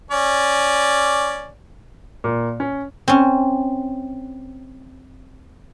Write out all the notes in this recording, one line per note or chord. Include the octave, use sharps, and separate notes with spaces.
C#4 D5
A#2
C#4
C4 C#4